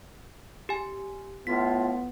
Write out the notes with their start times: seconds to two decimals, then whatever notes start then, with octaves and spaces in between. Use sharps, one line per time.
0.69 G4 G#5
1.47 A2 B3 F4 B6